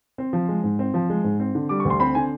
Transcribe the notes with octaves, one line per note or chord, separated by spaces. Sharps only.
C4
F3
G#3
G#2
C4
F3
G#3
G#2
C4
D3
G3 D6
D2 C#6
C6
C4 B5
D3 G#5